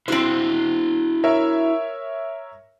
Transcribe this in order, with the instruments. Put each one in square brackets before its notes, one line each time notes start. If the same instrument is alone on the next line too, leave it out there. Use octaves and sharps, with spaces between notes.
[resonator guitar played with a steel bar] C4 C5 [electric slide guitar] E4 F#4
[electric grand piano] A#4 C#5 E5